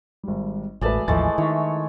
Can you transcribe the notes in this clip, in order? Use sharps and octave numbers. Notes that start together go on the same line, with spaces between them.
G#1 G3
E1 A1 A3 G#4 B4 D5 A5
A1 D#2 E3 F3 G#3 A3 A6
D#3 E4 C#5